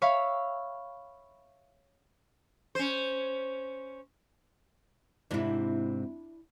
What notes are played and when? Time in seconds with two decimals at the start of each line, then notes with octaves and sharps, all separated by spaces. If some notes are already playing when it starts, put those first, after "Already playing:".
0.02 C#5 E5 F5 B5
2.75 C#4 C5
5.31 G#2 C3 C4 D4 E4